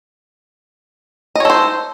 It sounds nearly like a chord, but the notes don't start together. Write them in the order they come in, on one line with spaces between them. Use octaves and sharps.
D#5 C#5 A4 C5